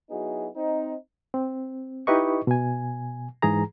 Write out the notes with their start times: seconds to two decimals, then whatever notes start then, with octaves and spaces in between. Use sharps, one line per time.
0.10 F#3 B3 D#4 E4 F#4 G#4
0.56 C4 D#4
1.34 C4
2.07 D#4 E4 G4 B4 D#5 C#6
2.47 B2 G#5
3.42 G#2 E3 G#4 A#5